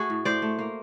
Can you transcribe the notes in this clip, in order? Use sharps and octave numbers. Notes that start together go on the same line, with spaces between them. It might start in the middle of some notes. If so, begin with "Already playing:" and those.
Already playing: A3 F#4 G#4
A2
A2 C5 D5
A3
A#3